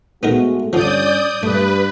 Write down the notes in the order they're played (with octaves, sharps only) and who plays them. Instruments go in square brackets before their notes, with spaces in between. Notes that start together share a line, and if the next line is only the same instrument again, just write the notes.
[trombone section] G#3 A3 F#4 [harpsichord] B3 D#4 A#4
[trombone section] G2 C#4 [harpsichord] D3 F3 [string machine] D5 D#6 G6
[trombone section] G2 [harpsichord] A3 [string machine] B4